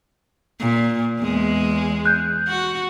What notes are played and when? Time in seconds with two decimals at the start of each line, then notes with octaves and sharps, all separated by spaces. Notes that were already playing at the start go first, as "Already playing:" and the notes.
0.60 A#2
1.19 E2 G#3
2.05 F#6 G6
2.48 F#4